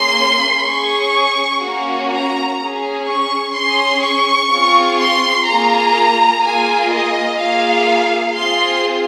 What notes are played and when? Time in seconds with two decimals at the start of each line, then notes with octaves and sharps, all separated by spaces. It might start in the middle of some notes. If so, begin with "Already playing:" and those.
Already playing: A#3 C#4 G#4 C6
0.67 C#4 G#4 C#6
1.63 A#3 C#4 F#4
2.12 A#5
2.59 C#4 G#4
3.07 C#6
3.55 C#4 G#4 C6
4.04 C#6
4.51 C4 F4 G#4
4.99 C6
5.47 A#3 F4 G#4 A#5
6.43 A#3 F4 G#4 G#5
6.91 D#5
7.39 A#3 F4 G#4 F5
8.35 C4 F4 G#4 C6